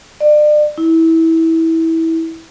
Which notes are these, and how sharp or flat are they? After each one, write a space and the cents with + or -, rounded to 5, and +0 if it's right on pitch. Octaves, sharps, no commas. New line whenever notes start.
D5 +35
E4 -20